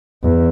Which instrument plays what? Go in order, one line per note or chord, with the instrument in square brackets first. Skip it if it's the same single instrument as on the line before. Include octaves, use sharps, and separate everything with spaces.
[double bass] E2